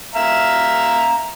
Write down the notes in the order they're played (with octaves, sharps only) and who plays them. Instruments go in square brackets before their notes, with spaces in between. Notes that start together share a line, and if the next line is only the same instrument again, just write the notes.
[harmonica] E5 F5 A#5